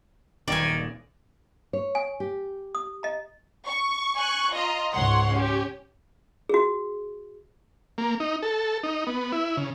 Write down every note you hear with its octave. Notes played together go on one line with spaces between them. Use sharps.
D#1 F#2 A#2 D#3 D5 G#5
C#5
G#5
G4
D#6
D#5 A#5
C#6
G#5 C#6 F#6
F4 D#5 A#5
C#2 G#2 C#5 F#5 C6
C#4 G4
F#4 G#4
A#3
D#4
A4
D#4
B3
E4
C#3